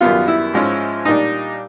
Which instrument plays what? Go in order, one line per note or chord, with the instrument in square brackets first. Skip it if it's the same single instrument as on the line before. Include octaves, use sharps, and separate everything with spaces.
[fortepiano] F#2 D#3 G3 B3 F4
E4
G#2 F3 G#3 C#4
A#2 G3 A#3 D4 D#4